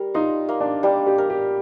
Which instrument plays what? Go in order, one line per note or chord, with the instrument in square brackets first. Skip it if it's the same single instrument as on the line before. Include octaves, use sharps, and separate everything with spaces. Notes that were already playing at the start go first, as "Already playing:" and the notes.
Already playing: [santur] G3 A#4
[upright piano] D#4 [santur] F4
[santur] A#3
[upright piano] D4
[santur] G3 [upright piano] D4
[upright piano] G4
[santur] A#4
[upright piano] G4